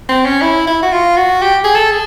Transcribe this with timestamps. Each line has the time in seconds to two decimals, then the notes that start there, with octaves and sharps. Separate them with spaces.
0.09 C4
0.26 C#4
0.41 E4
0.67 E4
0.82 F#4
0.92 F4
1.17 F#4
1.42 G4
1.64 G#4
1.75 A4
1.91 G#4